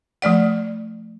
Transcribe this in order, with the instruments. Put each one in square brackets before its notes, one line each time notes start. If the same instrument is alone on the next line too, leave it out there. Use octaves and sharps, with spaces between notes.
[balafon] F3 A3 D5 F#5